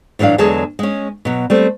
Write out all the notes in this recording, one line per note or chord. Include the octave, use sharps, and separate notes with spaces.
A2 E3 F#3 D4 F5
E2 D3 F#3 G#3 G#4 A5
G#3 C#4
B2 F#3
G3 A3 C4